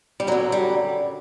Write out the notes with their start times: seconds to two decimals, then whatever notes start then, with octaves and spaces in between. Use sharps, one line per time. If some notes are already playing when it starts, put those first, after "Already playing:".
0.20 G3
0.27 F#2 D3 F#3
0.52 G3